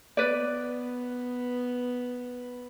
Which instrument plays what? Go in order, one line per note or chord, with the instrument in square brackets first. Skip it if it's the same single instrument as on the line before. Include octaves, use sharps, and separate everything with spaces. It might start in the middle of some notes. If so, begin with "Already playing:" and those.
[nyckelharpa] B3 [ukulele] B4 D5